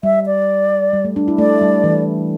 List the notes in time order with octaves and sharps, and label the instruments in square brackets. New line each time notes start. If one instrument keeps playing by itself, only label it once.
[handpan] G3 [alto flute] E5
[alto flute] D5
[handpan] G3
A3
D4
E4
[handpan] A3 [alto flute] D5
[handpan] G3
E3